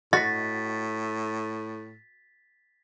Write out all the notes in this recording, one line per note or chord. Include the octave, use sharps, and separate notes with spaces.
A2 F#4 D#5 A6 B6